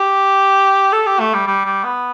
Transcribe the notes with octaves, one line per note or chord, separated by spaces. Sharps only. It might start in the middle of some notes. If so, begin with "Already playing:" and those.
Already playing: G4
A4
G4
A3
G3
G3
G3
B3